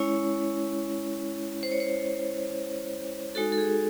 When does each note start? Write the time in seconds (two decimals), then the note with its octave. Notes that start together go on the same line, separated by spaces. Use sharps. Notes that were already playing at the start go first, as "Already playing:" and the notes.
Already playing: G#3 C#4 E4 C#5
1.63 C5
1.72 C#5
1.80 C5
3.35 G#3 D#4 F#4 A4
3.52 A4
3.58 G#4